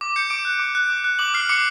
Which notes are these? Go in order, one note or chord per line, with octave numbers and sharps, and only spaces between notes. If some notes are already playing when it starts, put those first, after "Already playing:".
D6
G6 C#7
D6 D7
F#6
D6
F#6
D6
F#6
D6 F#7
F6 C7
D6 C#7